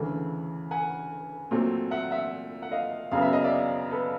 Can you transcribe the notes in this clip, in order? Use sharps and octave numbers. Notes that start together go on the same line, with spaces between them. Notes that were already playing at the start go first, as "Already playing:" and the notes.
Already playing: D2 C#3 E3 A3
F#5 G#5
A#2 F#3 A3 C4
E5 F#5
E5 F#5
F#5
D#5 F5
F#2 C#3 F#3 B3 F5
E5
D#5
D5 E5
A4 B4